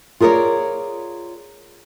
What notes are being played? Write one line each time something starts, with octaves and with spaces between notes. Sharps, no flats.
F4 G#4 A#4 B4 C#5 D5